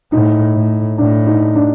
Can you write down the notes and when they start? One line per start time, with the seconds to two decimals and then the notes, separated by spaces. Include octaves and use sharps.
0.12 A2 D#4
0.55 A2
0.98 A2 D4
1.27 D#4
1.55 D4